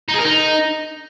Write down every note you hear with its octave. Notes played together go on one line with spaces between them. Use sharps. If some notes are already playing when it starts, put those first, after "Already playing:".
D#4
G#4
A#4
D#4